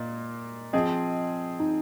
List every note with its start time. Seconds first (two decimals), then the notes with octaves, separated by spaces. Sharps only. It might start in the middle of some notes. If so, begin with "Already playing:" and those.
Already playing: A#2 A#3 D#5
0.73 F3 C4 G#4 D#5
1.59 D#4